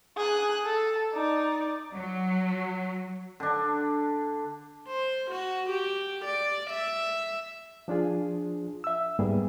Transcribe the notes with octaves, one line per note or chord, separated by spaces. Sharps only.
G#4 F#6
A4
D#4 D5
F#3
D3 D4
C5
F#4
G4
D5
E5
F3 D4 F4 G#4
E5 E6
G#2 G3 A#3 B3 G#4